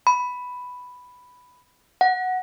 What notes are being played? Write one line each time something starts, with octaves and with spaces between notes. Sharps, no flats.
B5
F#5